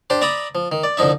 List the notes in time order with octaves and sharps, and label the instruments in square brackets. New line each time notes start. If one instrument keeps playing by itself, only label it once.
[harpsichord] D4 G4 C5
D5 E5 A#5 B5 D#6
F3
D#3
D5
C2 D3 F3 D#4 E5